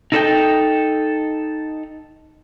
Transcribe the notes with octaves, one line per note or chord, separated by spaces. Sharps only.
D#4 E4 A4 B4 D#5 G5